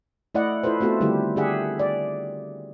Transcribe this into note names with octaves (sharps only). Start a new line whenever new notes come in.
A3 E4 D5 D#5 F#5
E4 F4 A4 B4 C5
A3 B3 C4 F4 F#4 A4
D3 D#3 G3 A3 E4 G4
D3 D4 G4 G#4 E5 F#5
D5